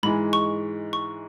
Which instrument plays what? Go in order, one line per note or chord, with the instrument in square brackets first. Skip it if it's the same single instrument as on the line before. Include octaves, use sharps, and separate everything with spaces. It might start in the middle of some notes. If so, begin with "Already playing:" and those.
[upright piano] G#2 E3 G#3 [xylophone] B5
[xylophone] C#6
C#6